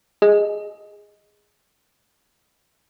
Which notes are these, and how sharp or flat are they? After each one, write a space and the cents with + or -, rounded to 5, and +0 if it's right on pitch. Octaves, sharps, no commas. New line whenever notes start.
G#4 -5 D#5 +5